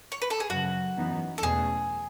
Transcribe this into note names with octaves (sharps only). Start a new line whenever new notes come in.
C#5
B4
A4
G#4
F#2 C#3 F#3 F#4
F#2 E3 B3 D#4
A4
E2 B2 A3 C#4 G#4